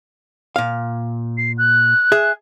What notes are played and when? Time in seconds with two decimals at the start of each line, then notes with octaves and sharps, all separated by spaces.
0.56 A#2 F5
1.37 C7
1.58 F#6
2.12 G#4 E5